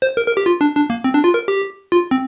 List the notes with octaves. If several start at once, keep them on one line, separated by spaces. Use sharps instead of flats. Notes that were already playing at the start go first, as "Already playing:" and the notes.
C5
A#4
A#4
G4
F4
D4
D4
A#3
C4
D4
F4
A#4
G4
F4
C4